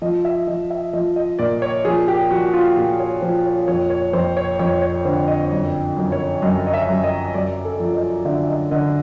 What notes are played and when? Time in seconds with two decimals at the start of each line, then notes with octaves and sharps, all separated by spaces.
0.02 F3 D#5
0.25 E5
0.47 F3 D#5
0.70 E5
0.93 F3 D#5
1.16 D#5
1.39 A#2 D5
1.62 C#5
1.85 F3 G#4
2.08 G4
2.31 F3 F#4
2.53 F4
2.76 A#2 G4
2.99 C#5
3.22 F3 C5
3.45 C#5
3.68 F2 C#5
3.90 C#5
4.13 F2 C5
4.37 C#5
4.59 F2 C#5
4.82 C#5
5.05 D3 C5
5.28 D#5
5.51 F#2
5.97 F#2
6.12 C#5
6.42 F#2 D#5
6.67 D#5
6.74 E5
6.89 F#2
7.04 D#5
7.34 F#2 D5
7.65 A4
7.80 F3
7.95 D#5
8.25 D3 E5
8.49 D#5
8.71 D3 D#5